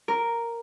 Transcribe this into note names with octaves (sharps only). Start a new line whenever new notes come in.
A#4